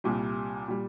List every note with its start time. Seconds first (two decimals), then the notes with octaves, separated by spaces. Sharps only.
0.04 C2 A#2 G3
0.68 A#2 G3